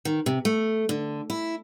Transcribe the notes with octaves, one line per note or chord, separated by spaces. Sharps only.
D#3
C3
A3
D3
E4